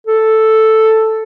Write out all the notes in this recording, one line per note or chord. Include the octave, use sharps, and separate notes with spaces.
A4